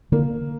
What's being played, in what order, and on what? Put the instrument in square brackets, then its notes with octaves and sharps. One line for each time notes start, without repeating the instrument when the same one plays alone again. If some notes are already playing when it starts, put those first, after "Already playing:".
[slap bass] D3 [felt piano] A#3